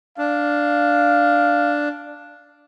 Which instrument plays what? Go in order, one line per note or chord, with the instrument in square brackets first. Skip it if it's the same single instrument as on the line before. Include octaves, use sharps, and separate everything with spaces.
[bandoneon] D4 [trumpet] F5